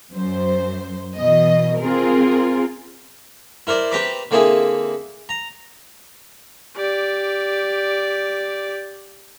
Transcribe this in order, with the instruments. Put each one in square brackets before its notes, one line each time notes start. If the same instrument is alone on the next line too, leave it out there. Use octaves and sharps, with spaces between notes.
[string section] F#2 C5
B2 E3 D#5
C4 F4 G#4 A#4
[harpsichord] E4 A#4 C5 D5
C4 G4 B4 A#5 B5 D6
D3 A#3 C4 E4 G#4
A#5
[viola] G4 D5